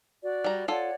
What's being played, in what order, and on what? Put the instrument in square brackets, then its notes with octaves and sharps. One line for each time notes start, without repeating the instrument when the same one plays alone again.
[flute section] F#4 D5
[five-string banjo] G3 A#5
[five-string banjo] F4 A4 [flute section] C#5 D5 F#5